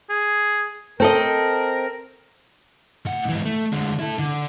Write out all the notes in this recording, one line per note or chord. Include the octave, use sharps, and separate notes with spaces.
G#4
C4 A4 A#4 D#5
A2 F#5
G#2 E3
A3
D3 G#3
E4 A4
D3